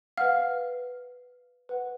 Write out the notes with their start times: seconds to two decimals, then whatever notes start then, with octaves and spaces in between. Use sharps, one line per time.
0.18 B4 F5 F#5 F6
1.69 B4 F#5